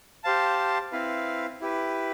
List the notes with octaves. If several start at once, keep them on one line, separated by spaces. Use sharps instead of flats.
G4 C5 F5 A5
C4 E4 B4 F5
E4 G4 B4